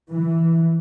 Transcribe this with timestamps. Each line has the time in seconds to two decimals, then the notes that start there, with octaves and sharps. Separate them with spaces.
0.11 E3